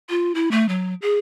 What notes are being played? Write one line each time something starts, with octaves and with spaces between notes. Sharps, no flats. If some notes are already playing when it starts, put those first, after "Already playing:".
F4
E4
A3
F#3
G#4